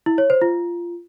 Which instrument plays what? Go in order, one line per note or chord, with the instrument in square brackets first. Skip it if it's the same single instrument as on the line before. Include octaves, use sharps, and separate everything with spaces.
[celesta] E4
C#5
C5
F4